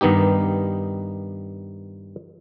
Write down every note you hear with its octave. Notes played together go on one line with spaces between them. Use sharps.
G2 D#3 B3 D#4 G4